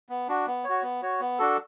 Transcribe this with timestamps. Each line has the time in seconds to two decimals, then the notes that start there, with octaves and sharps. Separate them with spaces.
0.09 B3
0.28 D4 F#4
0.47 B3
0.64 F#4 C#5
0.83 B3
1.02 F#4 C#5
1.21 B3
1.39 D4 F#4 A4